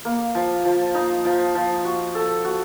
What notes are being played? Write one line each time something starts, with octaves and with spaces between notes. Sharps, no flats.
A#3
F3
F3
D#4
F3
F3
F#4
A4
F#4